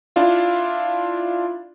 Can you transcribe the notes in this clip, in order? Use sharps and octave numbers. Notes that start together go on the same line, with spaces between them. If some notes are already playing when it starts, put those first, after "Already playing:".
D4 E4 F4 F5